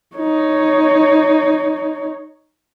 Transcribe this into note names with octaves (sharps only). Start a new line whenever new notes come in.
D#4 C#5